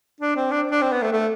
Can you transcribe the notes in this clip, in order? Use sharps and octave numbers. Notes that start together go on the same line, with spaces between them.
D4
C4
D4
D4
C4
B3
A3
A3